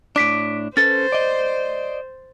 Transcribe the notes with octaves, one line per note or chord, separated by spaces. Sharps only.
A2 D4 D6 B6 D7
C#4 A4 B4 C5 A6
D5 D#5